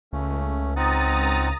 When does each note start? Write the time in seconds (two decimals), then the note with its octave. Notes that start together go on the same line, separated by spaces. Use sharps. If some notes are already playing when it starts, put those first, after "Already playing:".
0.13 C#2 A3 C#4
0.76 C4 D#4 F#5 A#5 D#6 A6